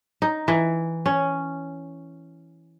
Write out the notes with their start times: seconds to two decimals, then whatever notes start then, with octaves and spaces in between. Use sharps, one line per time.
0.22 D#4
0.48 E3
1.06 C#4